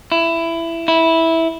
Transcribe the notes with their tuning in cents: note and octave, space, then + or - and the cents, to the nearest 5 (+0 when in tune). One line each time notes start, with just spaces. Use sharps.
E4 +15
E4 -10